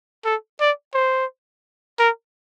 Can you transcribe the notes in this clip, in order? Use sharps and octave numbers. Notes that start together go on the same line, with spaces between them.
A4
D5
C5
A#4